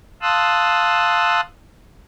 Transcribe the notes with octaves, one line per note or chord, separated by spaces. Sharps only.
F5 A5 C6 D#6 E6 F#6